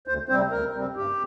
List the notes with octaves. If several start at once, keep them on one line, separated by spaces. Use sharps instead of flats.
D2 C5
C3 G3 C4 C5
D2 A#4
C3 G3 C4
G2 G4